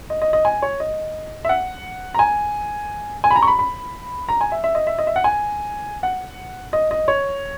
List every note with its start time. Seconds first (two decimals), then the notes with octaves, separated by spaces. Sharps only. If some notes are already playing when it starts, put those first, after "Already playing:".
0.10 D#5
0.21 D#5
0.33 D#5
0.45 G#5
0.62 C#5
0.80 D#5
1.45 E5
1.49 F#5
2.14 A#5
2.19 G#5
3.24 G#5
3.30 B5
3.36 A#5
3.42 C#6
3.48 B5
3.59 B5
4.29 A#5
4.41 G#5
4.52 E5
4.64 E5
4.75 D#5
4.87 E5
4.98 D#5
5.07 E5
5.16 F#5
5.24 G#5
6.03 F#5
6.73 D#5
6.91 D#5
7.08 C#5